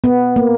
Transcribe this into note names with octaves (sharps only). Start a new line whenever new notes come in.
B3
A#3